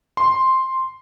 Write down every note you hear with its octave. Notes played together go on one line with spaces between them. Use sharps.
C6